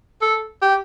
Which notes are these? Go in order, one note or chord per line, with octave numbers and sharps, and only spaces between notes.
A4
G4